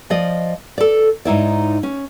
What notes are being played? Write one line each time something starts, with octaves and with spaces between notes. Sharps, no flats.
F3 D5 D#5
A4 D5
G#2 D#4 E4 D5
C#4